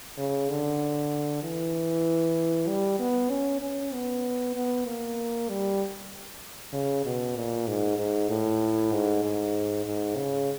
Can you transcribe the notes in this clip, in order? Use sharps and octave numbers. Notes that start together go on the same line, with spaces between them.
C#3
D3
E3
G3
B3
C#4
C#4
B3
B3
A#3
G3
C#3
B2
A#2
G#2
G#2
A2
G#2
G#2
G#2
C#3